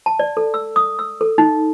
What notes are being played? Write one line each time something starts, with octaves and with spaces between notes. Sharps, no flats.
A5
D5
A4
E6
D#6
E6
A4
D#4